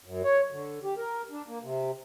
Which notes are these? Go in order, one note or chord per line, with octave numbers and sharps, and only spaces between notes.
F#2
C#5
D3
G4
A#4
D4
A#3
C3